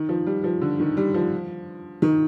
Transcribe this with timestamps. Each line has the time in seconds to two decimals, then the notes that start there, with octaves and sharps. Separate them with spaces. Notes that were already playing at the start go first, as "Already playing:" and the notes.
Already playing: D#3
0.09 F3
0.26 G3
0.44 F3
0.61 D3
0.80 D#3
0.97 G3
1.14 F3
2.02 D#3